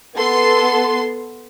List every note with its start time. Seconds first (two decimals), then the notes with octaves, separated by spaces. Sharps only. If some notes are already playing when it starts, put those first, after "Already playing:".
0.16 B3 A4 C6